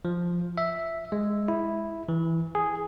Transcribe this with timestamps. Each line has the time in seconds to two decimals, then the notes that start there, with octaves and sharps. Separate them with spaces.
0.05 F3
0.58 E5
1.12 G#3
1.48 E4
2.09 E3
2.55 G#4